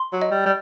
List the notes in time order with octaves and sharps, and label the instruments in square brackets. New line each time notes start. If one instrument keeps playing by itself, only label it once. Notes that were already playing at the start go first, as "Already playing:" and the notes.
Already playing: [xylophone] C6
[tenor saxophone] F#3
[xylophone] D#5
[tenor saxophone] G3
G3